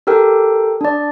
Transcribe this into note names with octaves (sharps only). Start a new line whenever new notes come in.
G4 A4 A#4 G5
D4 D5